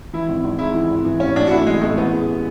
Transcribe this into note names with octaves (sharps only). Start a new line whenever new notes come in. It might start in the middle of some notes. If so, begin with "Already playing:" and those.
E3 E4
G#1
G#1
G#2 E4
E3
G#1
E3
A1 C#4
A1 D4
F#4
A2 E4
E3 G#3
A1 A3
E3 B3
G#3